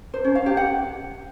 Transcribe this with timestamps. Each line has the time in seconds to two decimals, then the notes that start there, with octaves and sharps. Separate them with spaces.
0.14 C5
0.24 C#4
0.35 F5
0.46 G4
0.57 F#5